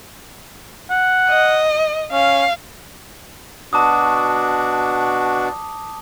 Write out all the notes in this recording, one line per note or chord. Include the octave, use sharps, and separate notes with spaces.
F#5
D#5
C#4 F5
B2 D4 F#4 A5 D6 D#6